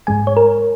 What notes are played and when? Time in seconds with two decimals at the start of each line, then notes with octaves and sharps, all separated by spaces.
0.07 G#2 G#3 G#5
0.27 C#5
0.37 A#4